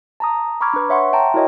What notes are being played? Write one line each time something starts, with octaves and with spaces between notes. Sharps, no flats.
A5 A#5 D#6
A#5 B5 C#6 D6 F6 G#6
D4 B4
C#5 E5 F#5 C6 C#6
E5 G5 A5 A#5 C6
E4 F#4 A#4 C#5 D#5 G5